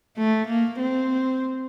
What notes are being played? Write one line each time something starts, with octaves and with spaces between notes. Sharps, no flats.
A3
A#3
C4